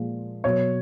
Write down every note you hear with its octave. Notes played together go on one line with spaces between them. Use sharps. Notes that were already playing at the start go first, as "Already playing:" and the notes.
Already playing: A#2 F3 G#3
B2 F#3 C#5